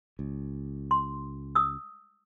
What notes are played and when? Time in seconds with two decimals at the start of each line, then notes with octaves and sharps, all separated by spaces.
0.19 C#2
0.91 C6
1.55 D#6 E6